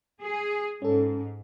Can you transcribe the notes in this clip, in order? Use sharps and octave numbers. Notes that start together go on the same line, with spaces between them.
G#4
G#2 C#4 A4